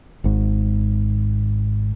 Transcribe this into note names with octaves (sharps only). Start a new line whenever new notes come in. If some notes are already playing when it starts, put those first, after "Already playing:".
G#1 G#2